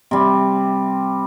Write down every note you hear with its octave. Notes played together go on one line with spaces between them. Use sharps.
C3 G3